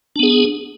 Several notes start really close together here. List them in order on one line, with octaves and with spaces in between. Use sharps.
D4 B3 G#4